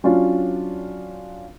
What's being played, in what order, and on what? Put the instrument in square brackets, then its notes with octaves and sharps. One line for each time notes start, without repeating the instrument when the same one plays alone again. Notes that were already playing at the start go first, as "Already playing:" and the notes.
[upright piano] F#3 C#4 D4 F4